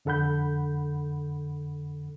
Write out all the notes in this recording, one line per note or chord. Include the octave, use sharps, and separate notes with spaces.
F2 D3 A4 F#5 B5 G6